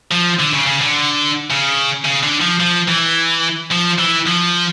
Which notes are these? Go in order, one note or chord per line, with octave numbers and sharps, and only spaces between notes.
F3
D3
C#3
C#3
D3
C#3
C#3
D3
F3
F3
E3
F3
E3
F3